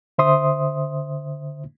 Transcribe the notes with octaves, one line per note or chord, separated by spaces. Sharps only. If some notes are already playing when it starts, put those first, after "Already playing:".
D3 C5 E5 C6 D#6